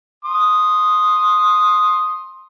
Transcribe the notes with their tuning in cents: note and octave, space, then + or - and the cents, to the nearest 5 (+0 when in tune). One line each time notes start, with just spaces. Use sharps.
C6 +10 D#6 +0